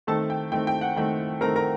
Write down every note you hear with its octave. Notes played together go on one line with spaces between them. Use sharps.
D#3 A3 C4 A4 A5
G5
D#3 A3 C4 G5
G5
F#5
D#3 A3 C4 G5
D#3 A3 C4 A#4 A#5
A#4 A#5